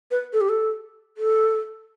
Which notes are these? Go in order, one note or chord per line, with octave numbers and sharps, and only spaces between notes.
B4
A4
G4
A4
A4